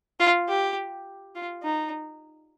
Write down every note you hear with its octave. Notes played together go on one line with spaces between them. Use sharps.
F4
G4
F4
D#4